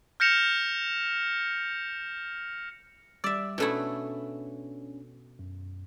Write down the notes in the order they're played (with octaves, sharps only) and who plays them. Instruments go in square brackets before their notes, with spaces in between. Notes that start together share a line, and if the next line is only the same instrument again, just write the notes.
[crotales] F6 G6 A#6 C#7 E7 F7
[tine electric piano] G3 D6 E6 [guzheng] D5 E5
[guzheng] B2 A3 E4 [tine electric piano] C#4 D4
[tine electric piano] F#2